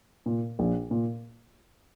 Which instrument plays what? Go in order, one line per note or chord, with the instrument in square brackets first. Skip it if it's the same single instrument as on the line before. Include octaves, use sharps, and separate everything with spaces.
[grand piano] A#2
A#1
A#2